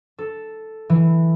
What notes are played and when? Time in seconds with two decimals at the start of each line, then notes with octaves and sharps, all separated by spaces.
0.18 A4
0.90 E3